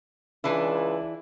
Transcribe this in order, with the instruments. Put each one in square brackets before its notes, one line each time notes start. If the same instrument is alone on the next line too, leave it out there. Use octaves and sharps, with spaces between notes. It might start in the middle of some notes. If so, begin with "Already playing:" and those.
[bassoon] C#2 [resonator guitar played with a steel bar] E3 D4 E4